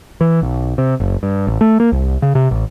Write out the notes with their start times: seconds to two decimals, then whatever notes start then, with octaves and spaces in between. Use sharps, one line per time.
0.21 E3
0.42 B1
0.78 C3
1.00 F#1
1.23 G2
1.47 A1
1.61 A3
1.80 A#3
1.92 C2
2.22 C#3
2.35 C3
2.51 A1